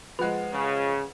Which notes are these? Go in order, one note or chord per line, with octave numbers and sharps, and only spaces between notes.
F3 G#3 B4 F#5
C#3